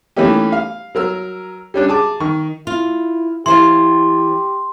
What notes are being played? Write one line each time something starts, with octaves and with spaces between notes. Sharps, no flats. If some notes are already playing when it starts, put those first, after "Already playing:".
E3 A3 A#3 C#4 D#4 G4
F5
F#3 A#4 E6
G3 C#4 D4
G#4 A5 D6
D#3 C#6
E4 F4
E3 G4 C5 F5 C6